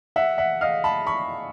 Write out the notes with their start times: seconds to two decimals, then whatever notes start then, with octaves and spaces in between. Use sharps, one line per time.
0.16 E5 F#5
0.38 E5 F#5
0.61 D#5 F5
0.84 A5 B5
1.07 B5 C#6